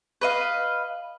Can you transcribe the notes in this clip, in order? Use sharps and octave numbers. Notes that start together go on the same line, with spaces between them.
B4 D#5 F5